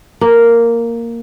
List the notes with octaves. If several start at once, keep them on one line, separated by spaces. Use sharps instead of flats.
A#3